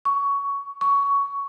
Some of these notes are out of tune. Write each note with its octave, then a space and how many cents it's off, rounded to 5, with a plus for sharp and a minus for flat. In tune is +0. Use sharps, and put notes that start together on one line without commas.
C#6 +15
C#6 +15